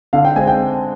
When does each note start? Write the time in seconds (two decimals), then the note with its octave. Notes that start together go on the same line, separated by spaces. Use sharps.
0.13 D3 F5
0.25 G5
0.36 G#3 C4 G#5
0.47 G5